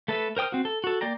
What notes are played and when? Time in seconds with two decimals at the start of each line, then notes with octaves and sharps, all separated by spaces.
0.08 A3 A4 B4 E5
0.37 A#4 C5 G5 D#6 F6
0.52 C4 F#4
0.65 A4
0.84 F#4 A4
1.01 A#3 D5 G5 A#5